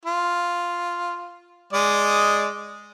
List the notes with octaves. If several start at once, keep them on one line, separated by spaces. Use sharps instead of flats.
F4
G#3 D5 D#5